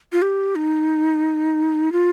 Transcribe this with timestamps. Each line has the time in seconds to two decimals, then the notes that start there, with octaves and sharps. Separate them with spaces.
0.12 F4
0.22 G4
0.56 D#4
1.92 F4